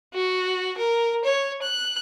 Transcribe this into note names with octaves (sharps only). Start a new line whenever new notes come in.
F#4
A#4
C#5
F#6